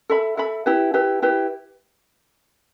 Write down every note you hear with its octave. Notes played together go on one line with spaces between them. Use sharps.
A4 E5 B5
A4 E5 B5
E4 G4 B4
E4 G4 B4
E4 G4 B4